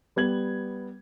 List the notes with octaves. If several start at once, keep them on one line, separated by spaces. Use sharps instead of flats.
G3 B3 G#6 F#7